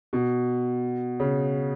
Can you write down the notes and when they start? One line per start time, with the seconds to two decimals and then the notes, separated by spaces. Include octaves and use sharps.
0.13 B2
1.20 C#3